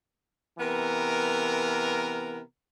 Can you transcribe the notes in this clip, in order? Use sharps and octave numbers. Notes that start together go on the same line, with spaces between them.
C3 E3 B3 A#4